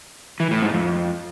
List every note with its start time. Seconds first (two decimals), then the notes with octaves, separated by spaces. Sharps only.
0.40 E3
0.51 A2
0.62 G#2
0.74 F2